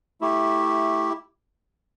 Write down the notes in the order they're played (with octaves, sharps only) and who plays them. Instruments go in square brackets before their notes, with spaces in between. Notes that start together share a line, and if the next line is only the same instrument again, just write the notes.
[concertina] A3 E4 G4